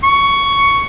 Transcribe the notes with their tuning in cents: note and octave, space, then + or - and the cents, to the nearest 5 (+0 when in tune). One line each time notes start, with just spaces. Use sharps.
C#6 +10